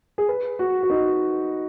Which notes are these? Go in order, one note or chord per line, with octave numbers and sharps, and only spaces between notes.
G#4
B4
F#4
F#4
D#4